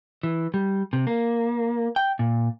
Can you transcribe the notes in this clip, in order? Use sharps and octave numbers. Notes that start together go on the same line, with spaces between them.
E3
G3
C3
A#3
G5
A#2